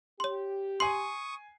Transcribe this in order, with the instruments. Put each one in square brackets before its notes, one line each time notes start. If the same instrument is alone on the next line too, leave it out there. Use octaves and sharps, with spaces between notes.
[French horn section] G4 [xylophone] C#5 C6
[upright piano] G#5 C7 [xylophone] C6 [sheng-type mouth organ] C#6 D#6